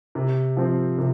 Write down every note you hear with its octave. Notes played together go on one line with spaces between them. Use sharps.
C3
F3 C4
C3